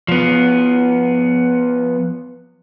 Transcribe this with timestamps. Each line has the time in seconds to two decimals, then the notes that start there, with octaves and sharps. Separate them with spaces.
0.08 F3 B3